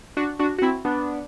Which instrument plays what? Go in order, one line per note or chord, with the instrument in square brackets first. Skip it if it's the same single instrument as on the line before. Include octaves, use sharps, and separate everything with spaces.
[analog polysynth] D4 F#4
D4 F#4
F#4
C4 E4
B3 D4